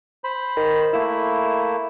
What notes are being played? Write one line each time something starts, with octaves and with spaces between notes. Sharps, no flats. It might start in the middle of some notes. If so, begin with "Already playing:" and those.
C5 B5
D#3
A3 A#3 E4